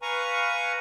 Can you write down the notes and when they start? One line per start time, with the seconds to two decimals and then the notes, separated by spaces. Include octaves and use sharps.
0.02 B4 F5 G#5 A#5 C#6